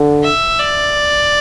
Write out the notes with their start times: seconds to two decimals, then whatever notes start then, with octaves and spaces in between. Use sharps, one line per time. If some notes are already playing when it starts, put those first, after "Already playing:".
Already playing: D3
0.24 E5
0.60 D5